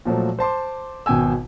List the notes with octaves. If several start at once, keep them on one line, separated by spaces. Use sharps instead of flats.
A#2 F3 F#3 A3
C5 A5 C6 D6
G#1 B2 G5 G#5 E6